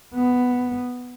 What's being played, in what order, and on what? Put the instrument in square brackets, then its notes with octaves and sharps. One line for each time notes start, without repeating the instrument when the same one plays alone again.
[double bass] B3